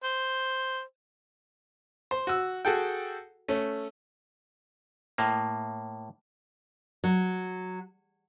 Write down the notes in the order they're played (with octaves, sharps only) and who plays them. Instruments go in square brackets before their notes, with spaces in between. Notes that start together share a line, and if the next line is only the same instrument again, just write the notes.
[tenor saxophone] C5
[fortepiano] C5
F#4 E6
F#4 G#4 A4 G5
A3 C#4
[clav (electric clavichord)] A2 A#3
[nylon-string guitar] F#3